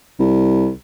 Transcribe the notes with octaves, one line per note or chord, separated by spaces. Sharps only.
C2